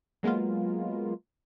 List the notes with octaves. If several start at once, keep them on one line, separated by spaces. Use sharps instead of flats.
F#3 G#3 A#3 B3 F4